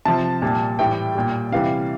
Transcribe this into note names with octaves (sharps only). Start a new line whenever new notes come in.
C3 F3 A5
A#2 G3
A2 E3 G3 G5
A#2 G3
C3 E3 G3 F5